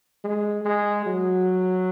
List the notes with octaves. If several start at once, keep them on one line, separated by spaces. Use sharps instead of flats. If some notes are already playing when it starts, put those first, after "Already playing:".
G#3
G#3
F#3